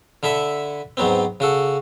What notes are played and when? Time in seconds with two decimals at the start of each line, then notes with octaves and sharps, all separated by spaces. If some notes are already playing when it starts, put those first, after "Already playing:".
0.23 D3 E4 A4 E5
0.97 G#2 F#3 B3 C4
1.40 C#3 F#4 A4